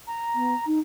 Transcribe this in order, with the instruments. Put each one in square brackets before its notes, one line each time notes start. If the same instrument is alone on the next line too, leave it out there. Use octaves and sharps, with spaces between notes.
[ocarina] A#5
[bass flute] B3
D#4